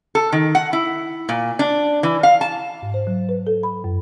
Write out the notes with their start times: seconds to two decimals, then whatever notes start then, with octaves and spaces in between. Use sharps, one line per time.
0.15 A4
0.32 D#3
0.55 F#5
0.73 E4
1.29 A#2
1.59 D4
2.03 E3
2.23 F5
2.41 A5
2.82 G#2
2.94 C5
3.07 F#3
3.29 B4
3.47 A4
3.63 B5
3.84 F#2